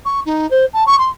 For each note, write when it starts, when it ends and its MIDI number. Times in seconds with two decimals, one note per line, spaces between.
0.05 0.20 85
0.26 0.49 63
0.51 0.65 72
0.73 0.84 81
0.87 0.96 85
0.99 1.09 84